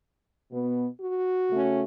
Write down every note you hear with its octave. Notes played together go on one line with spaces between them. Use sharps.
B2 B3
F#4
C#3 A3 C#4